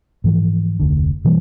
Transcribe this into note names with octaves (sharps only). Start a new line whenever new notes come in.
G#2 E3 F3
F1 D2 D3
B2 E3 G3 A#3